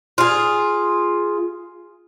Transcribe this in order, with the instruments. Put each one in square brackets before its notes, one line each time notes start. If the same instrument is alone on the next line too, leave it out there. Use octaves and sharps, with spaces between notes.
[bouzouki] F4 G#4